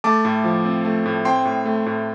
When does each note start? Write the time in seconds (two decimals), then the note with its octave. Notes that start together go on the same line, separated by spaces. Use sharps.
0.04 A3 A5 D6
0.25 A2
0.44 F3
0.65 C4
0.85 A3
1.06 A2
1.25 C4 G5 C6
1.45 A2
1.65 A3
1.86 A2